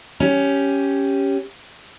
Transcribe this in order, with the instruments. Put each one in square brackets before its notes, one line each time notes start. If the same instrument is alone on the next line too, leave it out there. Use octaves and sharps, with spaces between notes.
[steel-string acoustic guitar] C#4 G4